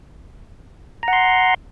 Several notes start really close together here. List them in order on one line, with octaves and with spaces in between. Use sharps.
A#5 F#5 C6